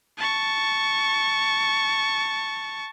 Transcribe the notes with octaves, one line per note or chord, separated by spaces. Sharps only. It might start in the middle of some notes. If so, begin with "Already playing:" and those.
A5 C#6